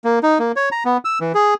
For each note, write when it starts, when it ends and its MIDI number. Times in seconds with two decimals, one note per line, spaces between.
0.04 0.19 58
0.23 0.38 63
0.39 0.52 58
0.56 0.69 73
0.72 0.84 82
0.85 0.97 59
1.05 1.19 88
1.21 1.32 52
1.35 1.54 68